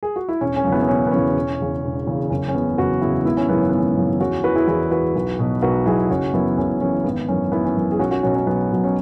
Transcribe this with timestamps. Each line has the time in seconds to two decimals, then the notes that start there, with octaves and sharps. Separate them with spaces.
0.03 G#4
0.16 F#4
0.29 E4
0.41 E1 C#4
0.56 C#4
0.65 E2 C#3 F#3
0.72 B3 E4
0.83 B3
0.88 E1 C#4
1.07 B3
1.12 E2 C#3 F#3 C#4
1.35 E1
1.60 E2 C#3
1.84 E1
2.07 E2 C#3
2.30 F#1 C#4
2.48 C#4
2.54 E2 C#3 B3
2.78 F#1 F#4 B4
3.01 E2 C#3 E4 G#4
3.25 G#1 B3 E4
3.37 C#4
3.49 F#2 C#3 E3 B3
3.60 C#4
3.70 G#1 B3
3.78 C#4
3.97 F#2 C#3 E3
4.20 E2 C#4 F#4
4.44 E3 F#4 B4
4.55 E4 G#4
4.68 E2 E4 G#4
4.91 E3 F#4 B4
5.15 B1
5.39 B2 F#3
5.62 B1 F#4 B4
5.86 B2 F#3 E4 G#4
6.10 F#1 C#4 F#4
6.33 F#2 E3 B3 E4
6.58 F#1 C#4
6.81 F#2 E3 C#4
7.04 G#1 B3
7.28 F#2 E3 C#4
7.52 G#1 B3 E4
7.64 C#4
7.76 F#2 E3
7.92 G#4
7.99 B1 C#4 F#4
8.11 C#4 F#4
8.23 B2 F#3 C#4
8.35 C#4
8.47 B1 B3
8.71 B2 F#3
8.84 C#4